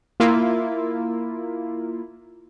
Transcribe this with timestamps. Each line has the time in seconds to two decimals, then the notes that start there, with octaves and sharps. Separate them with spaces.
0.20 A#3 E4 F4